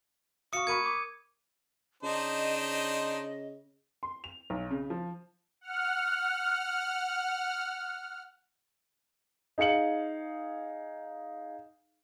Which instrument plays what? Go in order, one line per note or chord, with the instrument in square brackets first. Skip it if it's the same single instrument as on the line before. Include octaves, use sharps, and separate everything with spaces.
[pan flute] F#4 [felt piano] F5 C#6 [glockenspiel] D#6 C#7
[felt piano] A#4 B5 C#6 [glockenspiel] G#6 D#7
[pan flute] D6
[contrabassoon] C#3 [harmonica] D4 D#4 C5 [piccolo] D#5
[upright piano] C6
F7
B1
C#3
F3
[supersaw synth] F#5 F6
[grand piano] D#4 G#4 F5 C#7 F#7